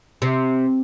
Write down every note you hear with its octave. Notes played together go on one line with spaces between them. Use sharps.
C3